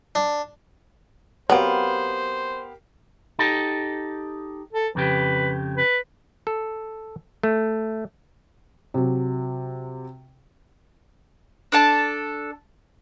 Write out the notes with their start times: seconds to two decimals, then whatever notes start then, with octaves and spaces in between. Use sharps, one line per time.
0.15 D4
1.50 F#3 B3 C4 G4 A#4 C5 F5
3.39 D#4 G4 A4
4.73 A4
4.95 F2 C#3 G4 B4
5.77 B4
6.47 A4
7.43 A3
8.94 C3 F#3
11.72 D4 A4 A5